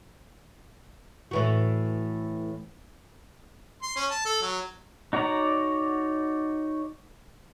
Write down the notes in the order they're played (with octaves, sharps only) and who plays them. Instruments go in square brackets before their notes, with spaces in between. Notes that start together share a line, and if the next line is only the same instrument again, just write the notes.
[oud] A2 E3 F#4
[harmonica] C6
C#4
A5
A4
F#3
[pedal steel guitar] D#4 F#4 C#5 D5 A#5